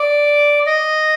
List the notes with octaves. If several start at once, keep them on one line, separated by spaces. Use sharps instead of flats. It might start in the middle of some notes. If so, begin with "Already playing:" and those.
Already playing: D5
D#5